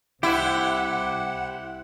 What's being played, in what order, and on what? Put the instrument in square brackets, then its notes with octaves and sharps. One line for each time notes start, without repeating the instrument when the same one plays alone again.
[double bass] C2 [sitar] E4 [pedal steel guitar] G4 C5 [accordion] F#5